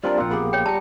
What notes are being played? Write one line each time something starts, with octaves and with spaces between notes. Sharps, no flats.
G3 C4 D4 F4 A#4 D5
A#1 A#3 C4 F#5
B3 G4 G#4
C#5 G5
G3 A5 A#5 C#7